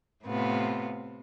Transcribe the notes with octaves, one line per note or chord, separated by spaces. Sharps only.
A2 C3 B3 F4